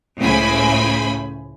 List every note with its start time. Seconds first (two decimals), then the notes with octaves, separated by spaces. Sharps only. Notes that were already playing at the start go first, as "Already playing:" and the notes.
0.19 C#2 A2 C#3 C5 G#5 B5